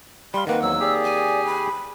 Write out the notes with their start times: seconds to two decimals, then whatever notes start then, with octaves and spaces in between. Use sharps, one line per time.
0.34 G3 F5 B5 C6
0.47 D#3 A#3 C4 B4 F#5
0.62 E2 F#3 E6
0.80 G4 G#4 D5
1.04 G#5
1.45 B5